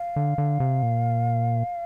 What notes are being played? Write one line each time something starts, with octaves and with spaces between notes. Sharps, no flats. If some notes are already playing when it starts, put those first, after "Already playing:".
Already playing: F5
D3
D3
C3
A#2